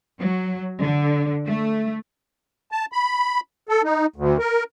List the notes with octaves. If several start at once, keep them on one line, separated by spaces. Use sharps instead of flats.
F#3
D3
A3
A5
B5
A4
D#4
D2
A#4